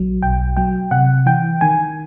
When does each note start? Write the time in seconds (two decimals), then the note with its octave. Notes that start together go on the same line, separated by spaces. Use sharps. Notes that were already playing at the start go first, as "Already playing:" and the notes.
Already playing: A#1 F#3
0.23 B1 G5
0.57 F#3 G5
0.91 C3 F#5
1.26 E3 G5
1.61 D#3 G#5